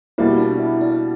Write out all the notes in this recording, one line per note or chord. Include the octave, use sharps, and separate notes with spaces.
B2 G3 A#3 E4
D4
E4
D4